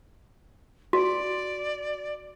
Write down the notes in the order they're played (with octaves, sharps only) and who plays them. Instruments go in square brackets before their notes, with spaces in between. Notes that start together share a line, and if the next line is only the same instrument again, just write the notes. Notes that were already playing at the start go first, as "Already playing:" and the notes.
[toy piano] F#4 [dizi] D5